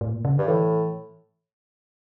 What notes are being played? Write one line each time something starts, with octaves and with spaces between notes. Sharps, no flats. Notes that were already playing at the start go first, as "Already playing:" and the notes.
A2
A#2
C#3
G2 D3
A2 E3